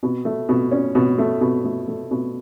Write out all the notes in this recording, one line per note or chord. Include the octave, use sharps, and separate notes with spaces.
B2
A3
B2
C#4
B2
A3
B2
A3
A3
B2